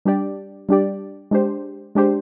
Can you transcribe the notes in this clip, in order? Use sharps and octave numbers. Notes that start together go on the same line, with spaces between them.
G3 D4 G4 D5
G3 D4 G4 D5
G#3 D4 G4 C5
G#3 D4 G4 C5